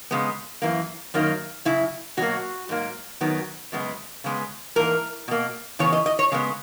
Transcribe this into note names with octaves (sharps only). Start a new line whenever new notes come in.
C#3 G#3 B3
F#2 E3 A#3
F#2 D#3 F#3 A#3
F#2 C#3 E4
B2 F#3 A#3 F#4
G#2 F#3 A#3
F#2 D#3 F#3 B3
F#2 C#3 G#3 B3
C#3 G#3 B3
G#2 E3 A#3 A#4
B2 A#3
C#3 E3 B3 C#5
D#5
D#5
C#5
C#3 G#3 B3